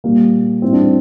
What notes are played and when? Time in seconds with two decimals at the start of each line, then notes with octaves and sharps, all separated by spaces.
0.04 A#2 G3 A#3
0.62 A2 G3 C4
0.73 D4
0.82 C4